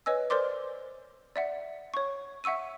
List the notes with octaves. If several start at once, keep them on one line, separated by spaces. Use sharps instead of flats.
B4 C#5 D#5 G#5 E6
A#4 C5 D5 C6 D6
D5 E5 F#5
C#5 C#6
E5 F#5 C#6 E6 D#7